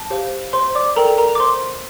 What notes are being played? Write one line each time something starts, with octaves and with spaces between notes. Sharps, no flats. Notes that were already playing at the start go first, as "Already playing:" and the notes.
Already playing: A5
G4 C5 F5
C5 C6
D5 D6
A4 A#4 D5 G5 A#5
A#4 A#5
D6
C5 C6